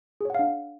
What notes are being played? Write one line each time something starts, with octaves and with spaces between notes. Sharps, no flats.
D4 G#4 C#5 F5 F#5